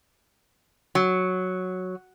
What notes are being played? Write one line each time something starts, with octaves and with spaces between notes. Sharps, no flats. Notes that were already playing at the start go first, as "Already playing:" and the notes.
F#3